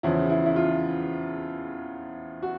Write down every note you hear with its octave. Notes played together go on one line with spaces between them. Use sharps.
E2 C#3 F3 E4
E4
E4
F4
F#4